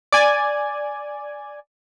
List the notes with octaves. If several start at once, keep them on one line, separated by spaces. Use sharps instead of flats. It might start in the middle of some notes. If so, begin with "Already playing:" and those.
D5 G#5 G#6